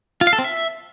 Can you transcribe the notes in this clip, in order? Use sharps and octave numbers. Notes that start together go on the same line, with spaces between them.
F4
F5
A4
C4
E5